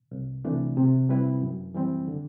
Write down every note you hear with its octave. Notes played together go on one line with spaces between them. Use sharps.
C2
C3 E3 A3 D4
C3
G3 C4 E4 B4
F#2
E3 G3 C4
D3